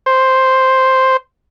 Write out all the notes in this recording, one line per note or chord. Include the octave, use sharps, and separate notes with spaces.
C5